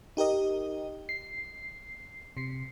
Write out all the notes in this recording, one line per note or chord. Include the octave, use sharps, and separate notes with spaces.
D#4 G4 A#4 D#5
C7
C3 C7